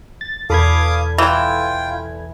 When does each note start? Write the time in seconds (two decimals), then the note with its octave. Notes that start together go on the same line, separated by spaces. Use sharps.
0.21 A6
0.50 E2 B2 A4 F5 B5 D6 D#6 G#6
1.18 E3 F4 G5